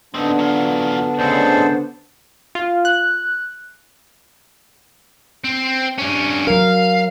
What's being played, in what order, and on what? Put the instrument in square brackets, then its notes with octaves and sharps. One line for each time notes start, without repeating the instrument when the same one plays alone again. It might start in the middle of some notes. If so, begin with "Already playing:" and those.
[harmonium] D3 B3 D4 [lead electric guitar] C4 D#4
[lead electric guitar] F#3 F4
[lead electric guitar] D2 G#3 [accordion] C#3 A4 C5
[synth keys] F4
F#6
[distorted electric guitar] C4
G2 C#4
[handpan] F#3 A#4 [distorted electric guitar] F5